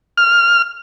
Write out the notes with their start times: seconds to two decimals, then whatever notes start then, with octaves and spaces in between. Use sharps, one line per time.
0.18 F6